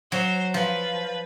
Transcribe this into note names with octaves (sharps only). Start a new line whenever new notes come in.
F#3 C5
F3 B4